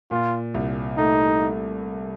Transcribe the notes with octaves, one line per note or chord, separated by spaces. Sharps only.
A#2 F4
C2
A3 D#4